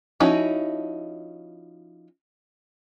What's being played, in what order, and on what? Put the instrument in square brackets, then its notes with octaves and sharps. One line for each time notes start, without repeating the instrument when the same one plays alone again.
[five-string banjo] F3 C#4 D#4 E4 F#4